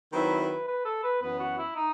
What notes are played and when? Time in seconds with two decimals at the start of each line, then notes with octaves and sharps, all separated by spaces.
0.13 D#3 F#3 C4 E4 B4
0.40 B4
0.67 B4
0.85 A4
1.03 B4
1.21 F#2 E3 B3 B4
1.39 F#4
1.58 E4
1.75 D#4